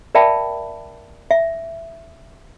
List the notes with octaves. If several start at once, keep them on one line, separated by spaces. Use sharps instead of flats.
A#4 D5 E5 G5 A5 B5
E5